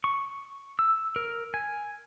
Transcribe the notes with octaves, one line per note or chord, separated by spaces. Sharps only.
C#6
E6
A#4
G#5